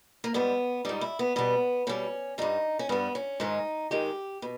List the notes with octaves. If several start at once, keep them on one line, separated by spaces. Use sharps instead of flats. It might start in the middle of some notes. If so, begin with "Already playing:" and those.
A#3
G#2 G3 B3
G#2 G3 D#4
E4
B3
B2 G3 B3
B2 G3 C#4
G2 G3 D#4
C#4
G2 G3 B3
C#4
G#2 D#3 G#3 D#4
G#2 D#3 G#3 G4
B2